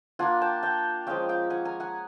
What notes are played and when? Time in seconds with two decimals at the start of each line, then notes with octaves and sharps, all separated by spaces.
0.19 A#3 D4 F4 F#5 G#5
0.41 G5 A5
0.63 F5 G5
1.07 F3 G#3 C#4 F5 G5
1.29 F5 G5
1.50 F#5 G#5
1.65 G#5 A#5
1.80 F#5 G#5